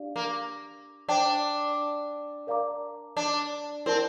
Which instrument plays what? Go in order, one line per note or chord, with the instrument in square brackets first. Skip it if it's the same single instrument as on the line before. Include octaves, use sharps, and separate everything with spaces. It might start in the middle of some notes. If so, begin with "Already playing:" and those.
Already playing: [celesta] D4 G4 D5 F5
[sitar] A#3
[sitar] D4 [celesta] C5 G5 D6
[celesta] A#4 D5 F5 A#5 D6
[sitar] D4
[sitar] C4 [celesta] E4 A#4 D5 A5